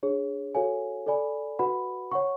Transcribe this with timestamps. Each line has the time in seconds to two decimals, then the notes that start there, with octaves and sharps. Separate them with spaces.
0.03 D4 G#4 C#5
0.55 F#4 A4 C#5 F5 G#5
1.07 A4 D5 G#5 B5
1.59 F#4 B4 F#5 B5
2.11 C#5 F#5 C#6